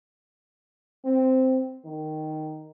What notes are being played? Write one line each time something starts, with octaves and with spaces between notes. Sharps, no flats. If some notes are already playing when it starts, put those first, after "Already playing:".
C4
D#3